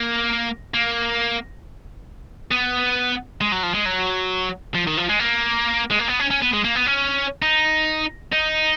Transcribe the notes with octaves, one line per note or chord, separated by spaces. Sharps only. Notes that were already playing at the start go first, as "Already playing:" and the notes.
Already playing: A#3
A#3
B3
G#3
F#3
F3
G#3
F#3
F3
D#3
F3
G#3
A#3
G#3
A#3
B3
C#4
C#4
B3
G#3
A#3
B3
C#4
D#4
D#4